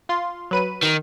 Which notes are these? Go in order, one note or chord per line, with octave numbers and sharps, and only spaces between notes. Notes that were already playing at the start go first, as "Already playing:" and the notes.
F4 C6
F#3 B4 D#7
D#3